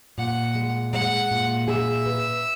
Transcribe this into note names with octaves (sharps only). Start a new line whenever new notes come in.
A#2 F#5
G#3
G#3 F#5
A#2
G#4 E5
B4